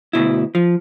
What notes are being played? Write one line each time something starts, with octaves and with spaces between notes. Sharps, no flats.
D2 G#2 B2 E4
F3